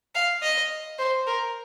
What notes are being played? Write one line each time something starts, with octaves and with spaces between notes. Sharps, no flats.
F5
D#5
C5
A#4